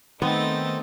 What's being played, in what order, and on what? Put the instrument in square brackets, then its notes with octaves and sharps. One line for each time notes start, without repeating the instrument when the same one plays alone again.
[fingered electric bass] D#3 [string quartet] A3 D#4 A6 [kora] B3 [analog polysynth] C4